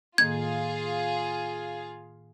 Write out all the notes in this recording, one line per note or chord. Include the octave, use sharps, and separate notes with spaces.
A2 D#3 A#3 F4 G#4 F5 G#6